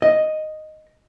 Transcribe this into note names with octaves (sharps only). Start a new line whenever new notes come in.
D#5